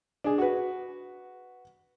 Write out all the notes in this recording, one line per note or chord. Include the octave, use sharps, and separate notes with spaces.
D4 G#4
F#4 B4